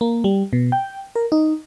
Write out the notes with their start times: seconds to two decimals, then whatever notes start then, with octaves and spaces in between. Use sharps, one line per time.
0.01 A#3
0.24 G3
0.53 B2
0.72 G5
1.16 A#4
1.32 D#4